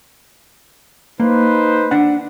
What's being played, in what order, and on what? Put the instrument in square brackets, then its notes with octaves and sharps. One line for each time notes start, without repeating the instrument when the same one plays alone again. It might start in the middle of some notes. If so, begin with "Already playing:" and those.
[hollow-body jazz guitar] A#3 [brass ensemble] D#4 B4 C5
[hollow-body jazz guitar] D4 F#5